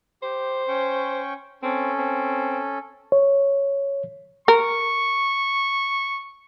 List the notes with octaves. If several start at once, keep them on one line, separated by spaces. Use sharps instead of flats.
G4 C5
C#4 G5 C#6
C4 C#4 A4
C4
C#5
A#4 C#6